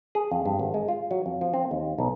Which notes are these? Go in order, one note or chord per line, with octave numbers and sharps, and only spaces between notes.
G#4
F2
G2
G#1
G#3
F4
F#3
F2
F3
C4
D#2
B1